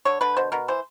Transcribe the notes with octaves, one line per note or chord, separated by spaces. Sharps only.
D3 C#5
D3 B4
B2 C5
B2 A#4
E3 C5